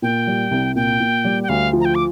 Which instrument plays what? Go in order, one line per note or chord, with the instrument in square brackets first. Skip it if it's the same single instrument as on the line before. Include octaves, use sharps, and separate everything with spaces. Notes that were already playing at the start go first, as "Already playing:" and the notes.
[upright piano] A#2 [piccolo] G5
[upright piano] G3
C2
[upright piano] A#2 [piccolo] G5
[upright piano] A#2
G3
[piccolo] G5
[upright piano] D2 [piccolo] F5
[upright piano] F3
[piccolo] A#5
G5
D6